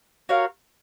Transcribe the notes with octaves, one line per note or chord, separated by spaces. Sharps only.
F#4 A#4 C#5 F5